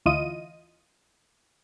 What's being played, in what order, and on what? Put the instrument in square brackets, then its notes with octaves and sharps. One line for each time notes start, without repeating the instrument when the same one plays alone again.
[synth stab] D2 E3 E4 F4 D#5 D#7